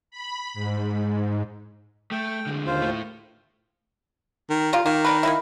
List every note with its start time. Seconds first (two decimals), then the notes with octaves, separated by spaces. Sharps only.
0.11 B5
0.54 G#2
2.12 A3 G5
2.47 D3 G#3
2.67 D#2 F4 C5
2.82 A2 A3
4.50 D#3
4.73 G3 A#3 F4
4.86 D#3 A#3
5.05 D4 A#4 B4
5.23 A#3 D#4 E4